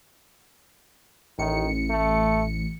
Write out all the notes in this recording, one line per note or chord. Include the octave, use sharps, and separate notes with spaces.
A1 D#3 C#7
A3